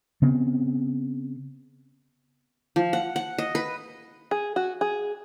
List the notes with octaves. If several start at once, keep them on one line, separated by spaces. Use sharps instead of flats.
C#3 B3 C4
F3
F#5
F#5
D#5
B4
G#4
F#4
G#4